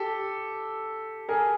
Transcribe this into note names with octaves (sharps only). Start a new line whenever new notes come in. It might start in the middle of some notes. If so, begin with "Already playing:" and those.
Already playing: G4 A4
G#4 A#4